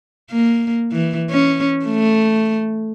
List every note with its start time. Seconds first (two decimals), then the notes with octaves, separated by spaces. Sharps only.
0.31 A#3
0.92 E3
1.30 C#4
1.86 A3